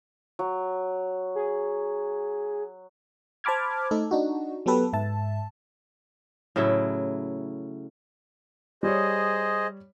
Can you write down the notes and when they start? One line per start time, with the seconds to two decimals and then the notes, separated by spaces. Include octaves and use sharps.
0.39 F#3
1.35 G#4
3.44 C5 A5 B5 D6 F6 G#6
3.91 A3 D#4 A4
4.11 D4 D#4 F#4
4.66 F#3 B3 G4 A4 B4
4.93 G#2 E5 A5
6.56 A2 C#3 F#3 E4
8.83 G3 G#4 C5 C#5 D#5